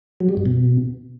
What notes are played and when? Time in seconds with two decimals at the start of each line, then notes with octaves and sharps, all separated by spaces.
0.20 F#3
0.29 G3
0.37 G2
0.46 B2